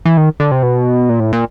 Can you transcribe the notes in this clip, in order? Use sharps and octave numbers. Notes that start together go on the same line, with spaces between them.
E3
D#3
D3
C3
B2
A#2
A2
A#2